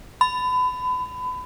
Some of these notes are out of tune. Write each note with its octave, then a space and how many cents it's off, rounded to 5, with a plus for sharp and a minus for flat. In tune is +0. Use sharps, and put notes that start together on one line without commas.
B5 +30